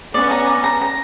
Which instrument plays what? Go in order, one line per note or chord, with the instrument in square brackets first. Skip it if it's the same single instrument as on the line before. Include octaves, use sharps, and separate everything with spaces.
[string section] B3 C#4 [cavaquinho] D5
[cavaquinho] A#5
A#5
A#5
A#5